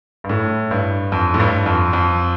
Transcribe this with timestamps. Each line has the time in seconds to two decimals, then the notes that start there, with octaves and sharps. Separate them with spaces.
0.24 G2
0.29 A2
0.71 G2
1.12 F2
1.34 A2
1.40 G2
1.66 F2
1.93 F2